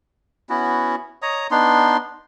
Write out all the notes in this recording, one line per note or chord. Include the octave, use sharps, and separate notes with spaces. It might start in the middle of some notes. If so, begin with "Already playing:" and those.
B3 C#4 E4 F#4
C#5 D#5 A#5 D#6
B3 D4 D#4 C6